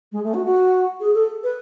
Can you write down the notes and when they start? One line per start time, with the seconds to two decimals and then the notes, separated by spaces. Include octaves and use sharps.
0.12 G#3
0.24 A3
0.34 F#4
0.46 F#4
1.00 G#4
1.15 A4
1.44 B4